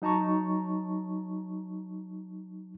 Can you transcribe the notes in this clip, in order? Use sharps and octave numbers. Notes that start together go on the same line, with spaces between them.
F#3 D#4 A5 A#5 C#6